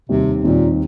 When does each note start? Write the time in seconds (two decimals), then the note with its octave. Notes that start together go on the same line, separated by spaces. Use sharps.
0.09 D#2 C3 D#3 G3 C4 D#4
0.44 D#2 A#2 D#3 G3 C4 D#4